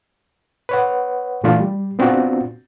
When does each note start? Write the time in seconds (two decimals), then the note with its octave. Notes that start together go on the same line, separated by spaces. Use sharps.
0.69 B4 C#5 F#5
1.44 A#2 E3 A3 D4 F4
1.60 G3
1.99 B3 C4 D4 F4 F#4